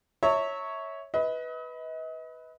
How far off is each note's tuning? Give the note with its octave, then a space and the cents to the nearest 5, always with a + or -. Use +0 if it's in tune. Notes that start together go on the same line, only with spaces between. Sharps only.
C#5 +0 E5 -25 A#5 -45
B4 +0 D#5 +35